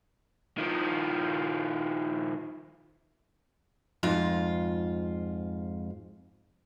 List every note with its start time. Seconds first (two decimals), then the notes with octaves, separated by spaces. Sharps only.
0.58 D#3 F3
4.03 F2 G#2 F4